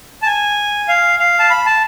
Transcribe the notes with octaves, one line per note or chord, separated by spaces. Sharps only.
A5
G#5
F5
F5
A5
B5
A5